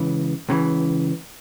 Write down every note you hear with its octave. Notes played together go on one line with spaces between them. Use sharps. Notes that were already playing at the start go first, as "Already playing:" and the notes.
Already playing: C#2 C#3 E3
C#2 C#3 E3